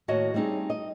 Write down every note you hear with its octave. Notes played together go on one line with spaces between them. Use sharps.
D#2 A2 F#4 C#5 D#5
G3 A3 C4 D#4 G#4
D#5